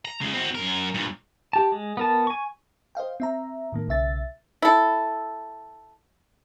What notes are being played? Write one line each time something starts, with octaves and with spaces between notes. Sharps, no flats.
A#5
C#3 G#3
C4 F#4
F#2 A#4
G2 A#2
G4 A5
G#3
B3 A#4 A5
G#5 C#6
C5 D#5 F5 G5
C4 E5 A#5
A2 D#3 A#3
B1 C#3 E5 A6
E4 A4